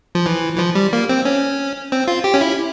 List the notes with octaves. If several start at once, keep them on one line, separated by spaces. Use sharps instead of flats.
F3
E3
E3
F3
G3
A#3
C4
C#4
C4
F4
G4
C#4
E4